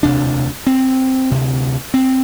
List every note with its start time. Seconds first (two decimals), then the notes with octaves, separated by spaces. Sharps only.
0.03 E1 D2 C3 D4
0.67 C4
1.31 D2 C3
1.94 C4